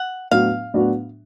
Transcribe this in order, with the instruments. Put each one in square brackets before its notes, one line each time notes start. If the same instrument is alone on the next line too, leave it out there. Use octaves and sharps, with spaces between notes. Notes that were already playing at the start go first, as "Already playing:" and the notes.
Already playing: [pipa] F#5
[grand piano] A2 F#3 B3 D4 F#4 [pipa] F5
[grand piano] A2 F#3 B3 D4 F#4